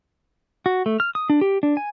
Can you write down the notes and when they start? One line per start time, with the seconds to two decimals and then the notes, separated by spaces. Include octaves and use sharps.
0.66 F#4
0.86 A3
1.00 F6
1.15 D#6
1.30 D4
1.41 G4
1.63 D4
1.77 G#5